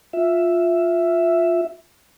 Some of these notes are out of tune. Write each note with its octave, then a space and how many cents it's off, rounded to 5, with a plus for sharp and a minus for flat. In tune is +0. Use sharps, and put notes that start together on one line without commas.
F4 +10 E5 +5